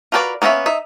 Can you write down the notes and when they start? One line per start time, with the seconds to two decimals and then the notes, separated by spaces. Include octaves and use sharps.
0.12 F4 F#4 A#4 B4 D5
0.42 A#3 B3 C#4 D#5 E5
0.66 D#4 E5